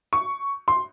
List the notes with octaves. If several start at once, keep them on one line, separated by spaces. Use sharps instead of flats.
C#6
C6